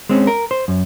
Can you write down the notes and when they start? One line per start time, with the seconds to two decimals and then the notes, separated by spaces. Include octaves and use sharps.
0.09 G#3 C4 C#4
0.27 A#4
0.51 C5
0.68 F#2